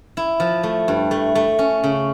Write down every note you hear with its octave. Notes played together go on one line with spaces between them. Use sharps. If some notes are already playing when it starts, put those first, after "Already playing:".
E4
F3
A3
G2
A3
A3
C#4
C#3